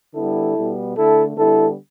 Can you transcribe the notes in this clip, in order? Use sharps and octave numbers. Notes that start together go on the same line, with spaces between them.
D3 G3 B3 E4 A4
B2 G3 B3
D3 A3 E4 A4
D3 G3 B3 E4 A4